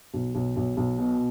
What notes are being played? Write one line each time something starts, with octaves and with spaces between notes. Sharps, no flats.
B1
B1
B1
B1
B2